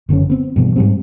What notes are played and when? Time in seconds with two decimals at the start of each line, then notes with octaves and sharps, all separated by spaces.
0.09 F#1 D3 E3 C#4
0.30 B3 C4
0.56 G2 B2 E3
0.76 G#2 G3 C4